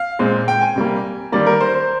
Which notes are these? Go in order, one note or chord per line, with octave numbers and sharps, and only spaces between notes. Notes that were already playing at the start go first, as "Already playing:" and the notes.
Already playing: F5
A#2 G#3 C4
G5
G#5
C3 G3 A#3
D#3 G3 A#3 D5
A#4
C5
C5